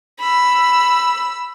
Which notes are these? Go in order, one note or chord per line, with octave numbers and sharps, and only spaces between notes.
B5 E6